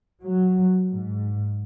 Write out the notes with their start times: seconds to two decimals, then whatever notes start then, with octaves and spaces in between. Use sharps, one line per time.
0.22 F#3
0.90 G#2